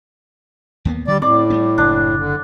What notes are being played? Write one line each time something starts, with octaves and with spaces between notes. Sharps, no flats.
D#2 A#3 B3
D3 G3 D5
A2 C4 D5
G3 A3 C#4
F#1 D4
D3